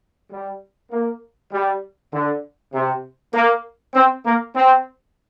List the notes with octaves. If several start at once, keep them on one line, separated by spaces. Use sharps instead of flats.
G3
A#3
G3
D3
C3
A#3
C4
A#3
C4